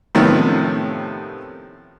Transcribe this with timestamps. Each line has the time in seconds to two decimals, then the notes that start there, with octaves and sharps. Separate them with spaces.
0.15 A2 C3 D#3 F3 B3 C#4